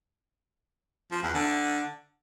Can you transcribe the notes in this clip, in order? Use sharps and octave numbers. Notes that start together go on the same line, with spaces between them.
F3
E2
D3